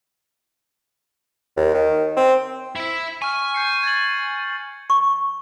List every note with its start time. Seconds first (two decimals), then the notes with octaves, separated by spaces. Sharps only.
1.57 D#2
1.74 D#3
2.17 C4
2.76 E4 E5
3.22 G#5 C#6 F6
3.54 G6 C7 C#7
3.83 G#6 A6 F#7
4.90 C#6